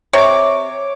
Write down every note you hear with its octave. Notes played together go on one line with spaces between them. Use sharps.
C3 C#5 D6